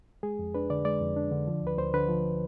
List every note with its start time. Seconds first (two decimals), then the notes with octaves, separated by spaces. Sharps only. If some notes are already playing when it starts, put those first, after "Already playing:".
0.23 G#3 G#4
0.39 F2
0.54 D4 B4
0.70 D3 D5
0.85 G#3 D5
1.01 F2
1.17 D4
1.31 D3
1.47 F3
1.62 D2 B4
1.78 D2 C5
1.93 D3 B4
2.09 F3